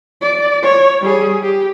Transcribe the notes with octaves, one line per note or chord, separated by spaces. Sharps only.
D5
C#5
G3 G#4
G4